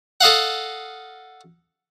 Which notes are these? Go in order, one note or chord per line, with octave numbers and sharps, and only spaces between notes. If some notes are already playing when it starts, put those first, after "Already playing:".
A4 D#5 F5 F#5